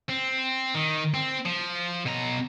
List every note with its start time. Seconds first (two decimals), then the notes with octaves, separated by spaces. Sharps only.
0.09 C4
0.75 D#3
1.14 C4
1.46 F3
2.06 B2 A#5